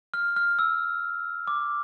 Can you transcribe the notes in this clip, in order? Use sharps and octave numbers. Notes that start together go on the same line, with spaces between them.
F6
F6
E6
D6